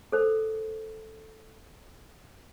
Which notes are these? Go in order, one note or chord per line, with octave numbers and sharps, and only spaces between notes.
A4 A#4 C5